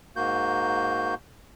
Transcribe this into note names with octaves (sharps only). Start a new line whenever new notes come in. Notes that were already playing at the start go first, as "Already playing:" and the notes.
G#2 A#3 F#4 G6